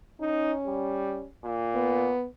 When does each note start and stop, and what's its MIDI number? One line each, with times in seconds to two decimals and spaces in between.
0.21 1.28 61
0.21 0.53 63
0.66 1.24 55
1.45 2.12 46
1.75 2.26 59